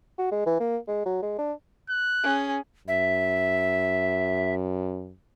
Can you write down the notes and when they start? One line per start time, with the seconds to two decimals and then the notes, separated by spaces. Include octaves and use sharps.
0.19 F#4
0.31 G#3
0.46 E3
0.60 A#3
0.88 G#3
1.06 F#3
1.22 G#3
1.38 D4
1.89 F#6
2.23 C#4 G#4
2.88 F#2 E5